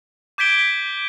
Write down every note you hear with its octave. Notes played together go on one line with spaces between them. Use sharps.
D6 G6 G#6 B6 D7 G7